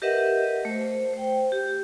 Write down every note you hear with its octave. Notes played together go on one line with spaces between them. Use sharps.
G4 A#4 B4 D#5 E5 F#5
A3 C5
C5 G5
G4